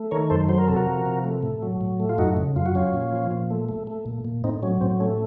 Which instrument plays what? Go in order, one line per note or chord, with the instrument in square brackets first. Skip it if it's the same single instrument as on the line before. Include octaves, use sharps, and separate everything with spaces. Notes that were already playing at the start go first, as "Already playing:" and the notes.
Already playing: [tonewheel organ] A3
D#3 A#4 C#5
F#2 A4 C5
F#3 C5
A#4
C3 A4
F#4 A#4
F3
C3
A3
A2
F#3
A2
A3
F4
F#2 D#4 F#4
C#3
F#2 F4
F#4
F#3 C#4 F4
A#2
F3
A#2
A3
A3
A3
A#2
A#2
A2 C4 D#4
F#3 C#4
A2 C4
A3 C#4